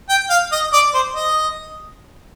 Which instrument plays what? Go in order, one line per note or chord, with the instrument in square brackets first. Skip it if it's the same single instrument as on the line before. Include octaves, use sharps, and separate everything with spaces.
[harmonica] G5
F5
D#5
D5
C5
D#5